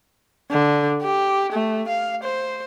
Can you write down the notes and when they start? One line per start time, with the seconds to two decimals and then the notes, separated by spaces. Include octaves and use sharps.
0.51 D3
1.02 G4
1.52 A3
1.88 F5
2.24 C5